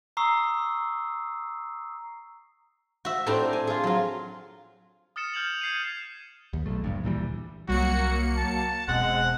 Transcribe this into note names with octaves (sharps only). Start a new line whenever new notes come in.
A#5 C#6 D#6 E6 C7
F#4 E5
A2 C4 D4 G4 A#5
G#5
F4 G#4
F#3 F4
D#6 F6 A6 C#7 E7
F6 G6 G#6 F7 F#7
G6 G#6 C7 C#7 D#7
D#2
D1 B1 A3
E1 A#1 G2
D2 A#2 E3 G3
C2 F#3 G3 A#3 F#4 C#7
A5
E1 B2 G#3 C4 F#5